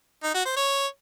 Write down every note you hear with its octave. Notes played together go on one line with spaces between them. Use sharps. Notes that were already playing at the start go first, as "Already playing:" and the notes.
D#4
F#4
C5
C#5